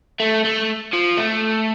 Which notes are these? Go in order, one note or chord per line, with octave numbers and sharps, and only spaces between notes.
A3
A3
F3
A3